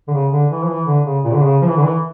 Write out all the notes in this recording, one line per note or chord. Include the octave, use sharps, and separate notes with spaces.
D3
C#3
D3
E3
F3
E3
D3
C#3
A#2
D3
C#3
F3
E3
D3
E3